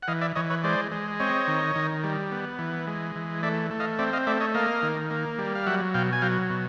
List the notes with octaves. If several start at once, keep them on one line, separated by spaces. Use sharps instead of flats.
F#5
E3 D#5 F5
D5 E5
E3 C#5 D#5
B4 C#5
G#3 C5 D5
G#3
C4 C#5 D#5
D#3
D#3
G3
B3
E3
G#3
E3
A3 D5 E5
A3
D#5 F5
C4 D5 E5
D#5 F5
A3 D5 E5
C#5 D#5
A#3 D#5 F5
D#3
A#3
G3
F5
F#3 E5 F#5
B2 F5 G5
G#5
F#3 F5 G5
B2